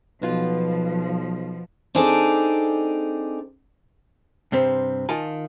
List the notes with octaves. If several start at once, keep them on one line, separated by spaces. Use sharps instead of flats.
B1 B2 F3 F4 B4
C4 D4 D#4 G#4 A4 D5
G2 C3 C4
D#3 F4 G#5 A5